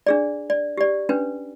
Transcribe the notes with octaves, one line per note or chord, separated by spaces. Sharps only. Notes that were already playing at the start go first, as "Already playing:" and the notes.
D4 G#4 D5
D5
G4 D5
C#4 D4 B4